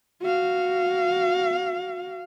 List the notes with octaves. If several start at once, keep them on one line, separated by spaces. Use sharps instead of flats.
F#4 F5